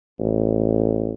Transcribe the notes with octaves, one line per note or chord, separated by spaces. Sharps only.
A1